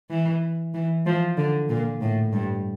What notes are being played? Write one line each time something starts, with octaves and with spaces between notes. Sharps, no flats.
E3
E3
F3
D3
A#2
A2
G2